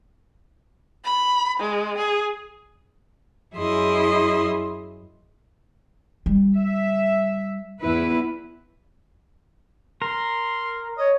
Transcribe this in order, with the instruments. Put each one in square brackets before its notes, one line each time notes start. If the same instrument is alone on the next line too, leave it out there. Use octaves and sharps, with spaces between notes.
[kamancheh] B5
G#3
G#4
[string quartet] F#2 E4 G#4 D#5 C6
[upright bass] G3
[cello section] E5
E2 E4 B4
[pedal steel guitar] A#4 [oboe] C6
[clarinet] C#5 [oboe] D#5